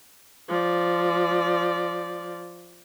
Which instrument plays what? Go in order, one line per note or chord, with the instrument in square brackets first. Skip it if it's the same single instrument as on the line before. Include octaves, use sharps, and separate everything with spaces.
[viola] F3 D5